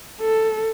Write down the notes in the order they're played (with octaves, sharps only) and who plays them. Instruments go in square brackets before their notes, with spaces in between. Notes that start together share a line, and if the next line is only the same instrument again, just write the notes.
[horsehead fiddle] A4